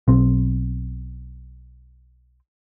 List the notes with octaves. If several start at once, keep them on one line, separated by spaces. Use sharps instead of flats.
B1 C4